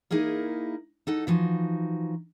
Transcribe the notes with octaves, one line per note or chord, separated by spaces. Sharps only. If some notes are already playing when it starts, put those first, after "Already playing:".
A#3 D#4 E4 G#4 A#4
D#4 A4 F#5
E3 F3 D#4 F#4